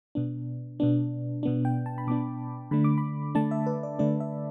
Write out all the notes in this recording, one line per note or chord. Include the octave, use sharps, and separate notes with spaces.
B2 B3 D4
B2 B3 D4
B2 B3 D4
G5
A5
B5
B2 B3 D4 D6
D3 A3 D4 B5
D6
B5
D3 A3 D4 A5
E5
B4
D5
D3 A3 D4 D5
E5